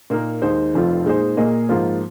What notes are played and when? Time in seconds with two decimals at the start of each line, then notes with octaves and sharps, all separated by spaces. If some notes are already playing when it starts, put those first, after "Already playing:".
0.10 A#2 A#3 D#4 A#4
0.42 D#2 D#3 G#3 D#4 C5
0.74 F1 F2 F3 C4 F4
1.05 A#2 G#3 D#4 G#4 C5
1.37 A#2 A#3 G#4 D#5
1.69 G#2 F3 A#3 F4 C5